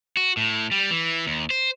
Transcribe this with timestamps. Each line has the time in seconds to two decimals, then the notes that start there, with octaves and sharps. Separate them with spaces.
0.17 F#4
0.37 A2
0.71 G3
0.91 E3
1.27 D#2
1.50 C5